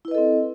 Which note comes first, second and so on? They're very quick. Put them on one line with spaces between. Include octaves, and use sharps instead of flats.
E4 B4 D#5 A4 C4